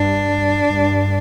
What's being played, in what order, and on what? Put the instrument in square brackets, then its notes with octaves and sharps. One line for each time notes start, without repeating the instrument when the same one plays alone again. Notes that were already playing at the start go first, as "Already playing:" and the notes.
Already playing: [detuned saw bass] G2 [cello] D4
[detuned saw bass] G2